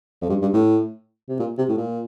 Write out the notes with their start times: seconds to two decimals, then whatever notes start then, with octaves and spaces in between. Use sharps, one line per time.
0.22 F2
0.29 G2
0.42 G2
0.53 A2
1.29 C3
1.39 A#2
1.58 C3
1.69 A2
1.77 A#2